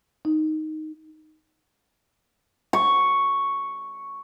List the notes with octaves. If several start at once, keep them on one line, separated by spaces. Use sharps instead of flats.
D#4
C#6